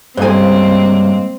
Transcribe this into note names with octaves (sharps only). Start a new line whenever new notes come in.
G2 C#3 G#3 A#3 C4 A4 C5 G#5